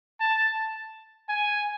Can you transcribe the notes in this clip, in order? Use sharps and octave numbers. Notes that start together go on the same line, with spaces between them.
A5
G#5